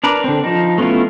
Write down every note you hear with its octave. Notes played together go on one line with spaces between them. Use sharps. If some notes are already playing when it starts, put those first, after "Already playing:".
D4 A#4 B4 D5
D3 C4
F3 D#4
A3 B3 C#4 E4 F4